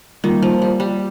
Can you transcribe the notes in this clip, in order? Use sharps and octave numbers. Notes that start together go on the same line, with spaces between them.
D#3 G3 A#3 F4
F3
G3
G3